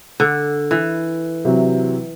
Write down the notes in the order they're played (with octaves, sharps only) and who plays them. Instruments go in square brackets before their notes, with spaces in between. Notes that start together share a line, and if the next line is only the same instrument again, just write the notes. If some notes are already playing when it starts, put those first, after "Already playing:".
[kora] D3
E3
[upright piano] C3 F#3 E4